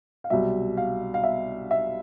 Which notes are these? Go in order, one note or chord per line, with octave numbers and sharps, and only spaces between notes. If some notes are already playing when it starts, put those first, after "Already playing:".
F5
C2 B2 F#3 E5
F5
F5
E5
E5